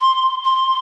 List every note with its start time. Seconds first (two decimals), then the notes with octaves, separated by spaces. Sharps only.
0.01 C6
0.44 C6